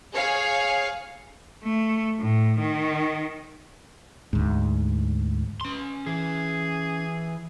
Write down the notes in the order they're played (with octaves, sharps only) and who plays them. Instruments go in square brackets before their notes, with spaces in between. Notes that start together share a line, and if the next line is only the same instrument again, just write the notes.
[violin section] G#4 C#5 F5
[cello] A3
A2
D#3
[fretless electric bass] D2 G#2
[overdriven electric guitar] C#4 C6
[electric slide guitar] E3 [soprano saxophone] G#4